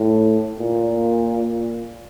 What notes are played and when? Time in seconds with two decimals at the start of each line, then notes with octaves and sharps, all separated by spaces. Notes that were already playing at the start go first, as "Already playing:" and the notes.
Already playing: A2
0.60 A#2